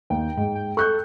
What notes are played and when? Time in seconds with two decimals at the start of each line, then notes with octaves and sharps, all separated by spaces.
0.10 D#2 G5
0.37 G#2
0.55 G5
0.77 A4 C#6 F#6 G6